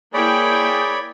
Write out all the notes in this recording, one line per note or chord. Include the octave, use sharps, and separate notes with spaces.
A#3 E4 G#4 C#5 D5 G5 B5